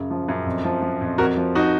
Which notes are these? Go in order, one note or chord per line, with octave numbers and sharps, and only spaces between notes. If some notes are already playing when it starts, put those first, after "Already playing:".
Already playing: F#2 C#3
F3
F#2
F2
F3
F3
F2
F2 F#4 A#4
F3
F3 D#4 F#4